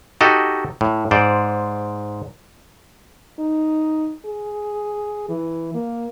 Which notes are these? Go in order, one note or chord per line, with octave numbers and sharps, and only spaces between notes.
D#4 F#4 G4 A4 D#5
A2
G#2 C5 D5
D#4
G#4
E3
A#3